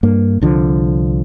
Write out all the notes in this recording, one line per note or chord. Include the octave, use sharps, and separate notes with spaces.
G2 A#3
C2 D3 F3